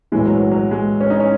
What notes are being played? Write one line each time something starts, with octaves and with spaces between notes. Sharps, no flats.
B1 A2 E3 G#3
F#3
F#3
F#3
G#3
C#4
D#4
C#4